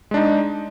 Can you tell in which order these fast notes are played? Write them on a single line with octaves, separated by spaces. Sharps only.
G#3 D4 D#4